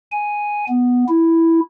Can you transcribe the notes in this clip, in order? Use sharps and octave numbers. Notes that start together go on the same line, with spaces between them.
G#5
B3
E4